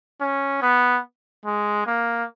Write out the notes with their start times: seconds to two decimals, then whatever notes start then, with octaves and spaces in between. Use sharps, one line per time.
0.21 C#4
0.62 B3
1.45 G#3
1.87 A#3